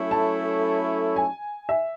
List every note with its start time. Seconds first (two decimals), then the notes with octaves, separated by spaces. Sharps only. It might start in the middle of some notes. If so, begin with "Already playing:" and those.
Already playing: F#3 A3 C#4 E4 A4
0.11 A5
1.16 G#5
1.69 E5